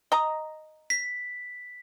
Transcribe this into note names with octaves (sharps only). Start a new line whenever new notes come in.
D#5 A#5
B6